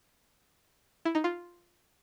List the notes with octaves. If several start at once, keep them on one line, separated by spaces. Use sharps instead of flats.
E4
D#4
F4